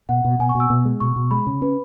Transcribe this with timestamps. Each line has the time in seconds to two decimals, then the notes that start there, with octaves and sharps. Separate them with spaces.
0.09 B2 F#5
0.25 B2
0.39 B2 G#5
0.49 C#6
0.55 B2
0.60 E6
0.70 B2
0.85 G#3
1.00 B2 C#6
1.16 B2
1.31 G#3 B5
1.47 C#3
1.62 C#4 B4